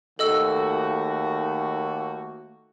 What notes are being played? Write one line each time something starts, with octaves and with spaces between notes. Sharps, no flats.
D#2 A3 A#3 F#4 A4 D#5 E6